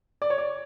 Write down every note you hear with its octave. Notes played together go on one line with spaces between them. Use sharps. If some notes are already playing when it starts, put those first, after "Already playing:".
D5
C#5
D5